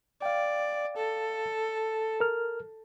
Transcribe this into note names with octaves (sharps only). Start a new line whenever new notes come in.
D5 F5 G5
A4
A#4 F6